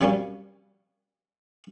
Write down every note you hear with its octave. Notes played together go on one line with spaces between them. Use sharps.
C3 F#3 G3 A#3 C#4